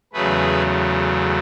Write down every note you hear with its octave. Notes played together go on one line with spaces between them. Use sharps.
E2 C#3 F#3 A3 G#4 B4